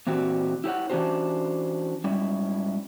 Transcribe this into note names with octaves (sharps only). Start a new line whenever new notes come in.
A#2 E3 C4 F#4 G4
E4 G4 C#5 F#5
E3 C#4 D4 F#4 G4 C5
G#2 G3 C#4 E4